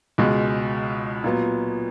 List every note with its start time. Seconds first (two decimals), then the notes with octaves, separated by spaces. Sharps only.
0.18 C#2 B2 G#3
1.24 A#2 F#3 B3